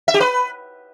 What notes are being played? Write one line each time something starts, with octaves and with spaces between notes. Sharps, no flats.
E5
G4
B4